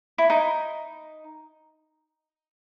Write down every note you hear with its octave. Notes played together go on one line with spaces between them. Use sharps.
E4
D#4